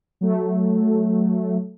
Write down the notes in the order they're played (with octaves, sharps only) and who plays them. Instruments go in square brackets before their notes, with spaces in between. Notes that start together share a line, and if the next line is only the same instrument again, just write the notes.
[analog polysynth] F#3 A3